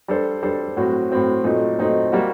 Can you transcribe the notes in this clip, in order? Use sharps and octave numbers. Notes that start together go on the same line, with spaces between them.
G3 D4 A4 C5
G3 D4 A4 C5
A2 F#3 C4 F#4
A2 F#3 C4 F#4
A#2 F#3 A3 C4 D#4
A#2 F#3 A3 C4 D#4
G3 A#3 F#4